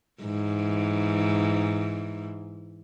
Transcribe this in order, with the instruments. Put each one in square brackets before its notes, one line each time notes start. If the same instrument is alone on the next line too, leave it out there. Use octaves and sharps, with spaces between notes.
[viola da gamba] G#2 E3